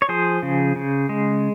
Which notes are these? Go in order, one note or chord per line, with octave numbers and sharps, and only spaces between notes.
C#5
F3 G#4 C5
C#3
C#3
G#3